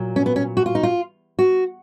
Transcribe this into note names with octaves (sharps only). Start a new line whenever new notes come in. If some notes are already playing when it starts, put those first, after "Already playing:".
Already playing: A#2 F#3
C#4
B3
C#4
F#4
F4
D#4
F4
F#4